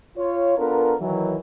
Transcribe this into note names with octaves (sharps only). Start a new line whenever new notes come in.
F4 C#5
B3 D4 F4 A4 A#4
D#3 E3 F#3